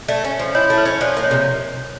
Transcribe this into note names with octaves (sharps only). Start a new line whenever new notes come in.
A3 D5 E5
C#4
F3
E4 C#5 D#5
A3
B4 C#5
C#4
F3 C5 D5
A#3
C#5 D#5
C3